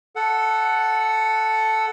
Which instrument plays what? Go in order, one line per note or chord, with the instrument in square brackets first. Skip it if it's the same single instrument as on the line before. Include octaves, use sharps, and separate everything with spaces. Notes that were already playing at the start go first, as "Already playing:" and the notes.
[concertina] A4 F#5